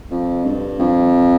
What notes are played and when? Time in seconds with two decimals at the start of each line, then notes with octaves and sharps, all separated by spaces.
0.11 F2
0.45 G2
0.79 F2